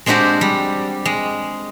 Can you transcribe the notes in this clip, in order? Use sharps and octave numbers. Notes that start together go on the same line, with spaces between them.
G#3 C4 D4 F#4 G4
G3
G#3